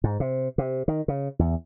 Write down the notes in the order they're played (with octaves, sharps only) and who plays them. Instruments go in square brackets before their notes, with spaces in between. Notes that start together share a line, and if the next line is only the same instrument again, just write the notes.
[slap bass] G#2
C3
C3
D#3
C#3
E2